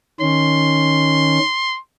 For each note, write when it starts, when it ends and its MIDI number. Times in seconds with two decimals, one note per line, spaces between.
0.21 1.39 51
0.21 1.39 61
0.21 1.78 84